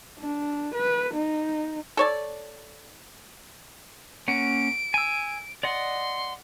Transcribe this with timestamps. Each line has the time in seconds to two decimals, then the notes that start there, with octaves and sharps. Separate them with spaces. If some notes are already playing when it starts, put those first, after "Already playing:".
0.19 D4
0.74 B4
1.14 D#4
1.97 A4 C#5 D5
4.28 A#3 C#4 F#5 D7
4.94 G#5 E6
5.63 D5 D#5 F#5 C6